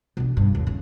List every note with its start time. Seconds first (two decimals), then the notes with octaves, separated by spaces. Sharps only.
0.17 B2 D3
0.37 G2
0.55 D#2
0.67 C#3